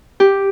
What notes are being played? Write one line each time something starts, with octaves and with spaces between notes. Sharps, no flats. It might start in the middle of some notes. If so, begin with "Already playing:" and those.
G4